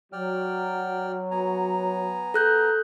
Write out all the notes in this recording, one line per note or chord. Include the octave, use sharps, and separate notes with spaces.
F#3 D5 G5 F6
B3 G#5 A#5
A4 F#6 G6